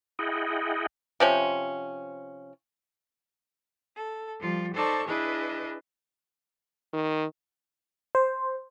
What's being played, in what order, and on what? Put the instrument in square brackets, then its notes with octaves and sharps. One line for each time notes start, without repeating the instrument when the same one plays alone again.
[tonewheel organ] E4 G#4 D#5 F#5 G5
[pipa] C3 F3 C#4
[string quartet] A4
F3 G3 F4
D#4 A4 C5 D5 A5 C#6
D4 E4 G#4 B4 D#5
[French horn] D#3
[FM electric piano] C5